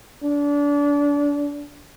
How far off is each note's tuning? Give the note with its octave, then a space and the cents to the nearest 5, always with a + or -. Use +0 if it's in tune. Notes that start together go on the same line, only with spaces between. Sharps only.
D4 -30